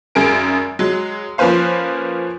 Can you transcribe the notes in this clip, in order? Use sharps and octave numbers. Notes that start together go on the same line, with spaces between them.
G#1 F#2 G#4 A#4 D7
F#3 G#3
F3 A#3 C#4 B4 C5 F5